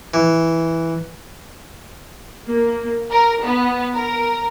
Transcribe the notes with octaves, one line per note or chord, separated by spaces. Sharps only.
E3
A#3
A#4
B3
A#4